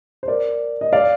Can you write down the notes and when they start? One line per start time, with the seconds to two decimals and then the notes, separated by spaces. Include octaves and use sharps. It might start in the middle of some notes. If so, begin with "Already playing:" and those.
0.23 C5
0.28 A#4 D5
0.81 D#5
0.93 D5 F5